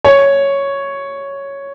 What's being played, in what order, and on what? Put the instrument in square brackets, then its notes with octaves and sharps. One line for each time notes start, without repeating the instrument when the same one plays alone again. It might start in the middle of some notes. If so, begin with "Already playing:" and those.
[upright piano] C#5